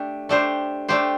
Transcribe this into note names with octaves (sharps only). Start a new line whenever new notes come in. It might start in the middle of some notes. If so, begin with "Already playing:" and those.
Already playing: A3 D4 G4
A3 D4 G4 C5
A3 D4 G4 C5